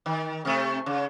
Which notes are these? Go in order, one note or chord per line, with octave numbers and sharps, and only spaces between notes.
D#3
C3 A3
C#3